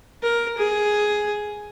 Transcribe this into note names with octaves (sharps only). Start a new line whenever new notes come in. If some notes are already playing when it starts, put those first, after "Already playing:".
A#4
G#4